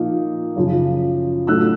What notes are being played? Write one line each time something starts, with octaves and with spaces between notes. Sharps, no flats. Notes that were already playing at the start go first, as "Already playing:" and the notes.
Already playing: A#2 F3 A#3 D#4
F#2 C#3 F3
A2 F#3 A3 E6 F#6